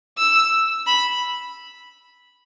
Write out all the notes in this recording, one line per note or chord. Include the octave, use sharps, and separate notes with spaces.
E6
B5